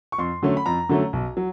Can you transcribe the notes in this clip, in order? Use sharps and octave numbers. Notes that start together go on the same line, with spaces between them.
C#6
F2 C6
D3 F#3 A3 C#4
B5
F2 A#5
D3 F#3 A3 C#4
B1
F#3